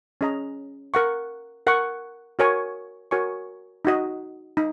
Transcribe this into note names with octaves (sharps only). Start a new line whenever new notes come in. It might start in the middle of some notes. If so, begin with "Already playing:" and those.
C#4 G#4 D#5 A#5
A#4 F#5 C#6
A#4 F#5 C#6
F#4 A#4 C#5 G#5 C#6
F#4 A#4 C#5 G#5 C#6
D#4 F#4 D#5
D#4